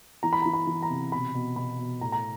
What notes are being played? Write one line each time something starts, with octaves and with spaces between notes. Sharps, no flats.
E3 A#5
B5
E3 A#5
B5
E3
A#5
C3
B2 B5
B2
B2 B5
B2
A2 A#5
A#5